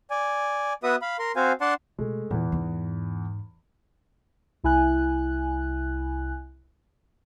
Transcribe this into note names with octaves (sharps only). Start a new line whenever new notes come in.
D5 G#5
B3 F#4 B4 E5 D#6
F5 B5
A#4 C6
C4 F#4 C5 F5 G#5
D4 D5 F#5 A5 C6
B2 G#3 A3
E2 A#2 E3 C#4
G#2 D#4
C2 E4 G#5 F#6